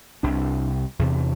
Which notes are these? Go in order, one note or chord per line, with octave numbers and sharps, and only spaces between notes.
C2 C3 D4
E2 C3